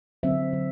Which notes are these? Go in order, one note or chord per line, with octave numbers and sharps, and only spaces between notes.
D3 F#3 C4 C5 E5
D3 F#3 C4